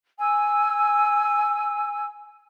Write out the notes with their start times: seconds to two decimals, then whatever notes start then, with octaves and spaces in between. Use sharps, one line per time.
0.18 G#5 E6